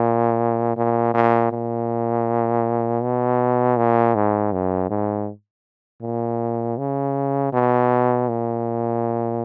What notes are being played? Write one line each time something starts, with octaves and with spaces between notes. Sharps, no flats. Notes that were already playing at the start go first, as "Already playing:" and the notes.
Already playing: A#2
A#2
A#2
A#2
B2
A#2
G#2
F#2
G#2
A#2
C#3
B2
A#2